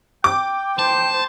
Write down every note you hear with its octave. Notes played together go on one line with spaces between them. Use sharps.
G5 D6
C5 A5